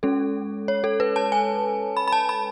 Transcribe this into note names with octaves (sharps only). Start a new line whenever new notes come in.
G#3 C#4 A4
C#5
A4
B4
A5
G#5
B5
B5
A5
B5